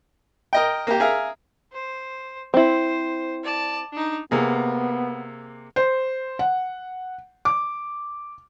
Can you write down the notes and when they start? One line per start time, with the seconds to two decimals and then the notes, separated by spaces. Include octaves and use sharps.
0.53 A#4 D#5 G5
0.87 A#3 G4
1.00 G#4 A#4 E5 F5
1.73 C5
2.54 C4 E4 C5
3.43 D5 A5
3.92 D4 D#4
4.31 C3 A#3 B3 G#4
5.76 C5
6.39 F#5
7.45 D6